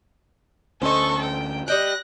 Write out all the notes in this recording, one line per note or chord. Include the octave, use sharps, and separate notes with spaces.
D2 C#4 A4 C5 D#5 C#6
G5
G3 D#5 G5 F#6 A#6